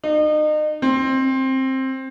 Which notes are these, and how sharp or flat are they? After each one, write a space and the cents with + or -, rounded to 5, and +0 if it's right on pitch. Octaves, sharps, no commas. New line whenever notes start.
D#4 -35
C4 +15